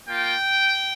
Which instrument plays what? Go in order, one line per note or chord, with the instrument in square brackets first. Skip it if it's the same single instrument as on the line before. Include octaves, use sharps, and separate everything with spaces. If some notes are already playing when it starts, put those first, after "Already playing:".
[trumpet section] A#3 F4 G5